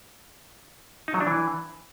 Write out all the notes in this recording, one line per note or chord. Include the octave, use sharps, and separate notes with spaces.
D#4
F#3
D4
E3